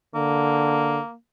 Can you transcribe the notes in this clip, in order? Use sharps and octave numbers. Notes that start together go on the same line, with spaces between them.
D3 A#3